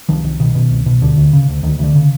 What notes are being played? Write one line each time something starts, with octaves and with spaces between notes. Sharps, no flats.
C2 D#3 F3
C2 D#3
B2 D#3
B2
C2
B2
D2 D3
D2
C#3
D2
D2 D#3
D2 D3
C#3